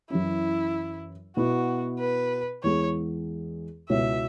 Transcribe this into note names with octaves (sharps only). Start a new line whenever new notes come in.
F#2 E3 C#4 E4
B2 B3 E4 F#4
B4
E2 E3 G#3 B3 G#4 C#5
C#2 B2 B3 E4 C#5 E5